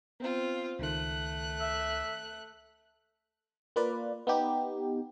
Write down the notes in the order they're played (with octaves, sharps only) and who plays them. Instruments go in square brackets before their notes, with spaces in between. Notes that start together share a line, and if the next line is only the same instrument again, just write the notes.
[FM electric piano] B3 [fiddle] C4 F4
[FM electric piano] C#2 D#3 [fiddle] A3 F#6
[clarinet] E5
[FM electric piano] A#3 F4 B4 D5
B3 D#4 G4